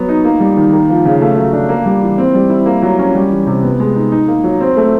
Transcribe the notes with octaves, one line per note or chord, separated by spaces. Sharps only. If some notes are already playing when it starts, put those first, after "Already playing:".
Already playing: F#3 B3
D#4
A#3
G3
D#3
A#3
F3
C#3
A3
F#3
D4
A#3
G3
E3
C4
G3
E4
A#3
F#3
C#4
G3
E3
C3
B3
G#3
D#4
D#4
A#3
F#3
C4
A3